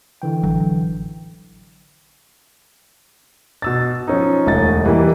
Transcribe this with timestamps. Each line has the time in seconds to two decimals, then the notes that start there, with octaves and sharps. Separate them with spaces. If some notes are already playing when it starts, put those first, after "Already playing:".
0.22 D3 E3 G5
0.43 A1 F#3
3.62 B2 E6 A6
4.07 F3 C#4 D#4
4.46 E1 D2 D#5 A6
4.86 E3 G3 A#3 E4